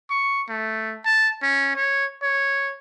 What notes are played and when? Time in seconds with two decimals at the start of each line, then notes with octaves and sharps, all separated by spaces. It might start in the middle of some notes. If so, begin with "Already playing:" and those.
0.10 C#6
0.49 A3
1.05 A5
1.42 C#4
1.76 C#5
2.23 C#5